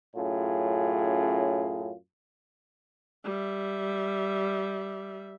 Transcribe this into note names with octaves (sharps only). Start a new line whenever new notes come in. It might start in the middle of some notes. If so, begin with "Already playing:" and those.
F#2 A2 C#4 F4 G#4
G3 E5